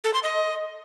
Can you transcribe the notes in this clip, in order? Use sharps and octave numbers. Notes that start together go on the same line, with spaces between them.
A4
C6
D#5